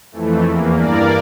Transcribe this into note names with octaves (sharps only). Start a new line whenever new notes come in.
F2 E3 A3
E2 E3 A#3
G2 E3 A#3 A#4 D5